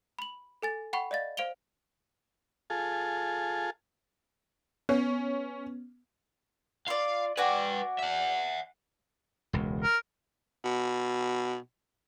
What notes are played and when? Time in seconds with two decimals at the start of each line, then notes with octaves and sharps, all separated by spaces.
0.19 B5 F#7
0.62 A4 G#5 A6
0.93 F#5 G5 B5 C#6
1.11 D5 D#5 F5 A6
1.37 C5 F5 D7 F7 G7
2.70 F4 G#4 A4
4.89 B3 C#4
6.88 F4 D5 F5
7.37 F#4 B4 D5 G5 G#5
7.99 E5 F#5
9.53 E1 C#2
9.83 A#4
10.64 B2